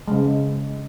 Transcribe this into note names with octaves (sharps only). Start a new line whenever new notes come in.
C#3 G#3